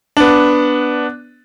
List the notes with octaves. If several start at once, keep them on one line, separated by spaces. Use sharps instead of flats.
B3 D4